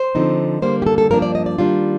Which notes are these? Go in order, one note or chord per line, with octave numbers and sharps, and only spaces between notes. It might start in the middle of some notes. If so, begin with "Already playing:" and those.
Already playing: C5
D3 F3 C4 D#4
D3 G3 A#3 C5
G4
A4
A4
G2 F3 A#3 D4 A#4
D5
D#5
D5
D#3 G3 A#3 D4 F4